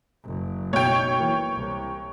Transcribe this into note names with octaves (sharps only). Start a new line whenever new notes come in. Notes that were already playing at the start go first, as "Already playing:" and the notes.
F#1
B1 C#5 G5
E3 A#3
C2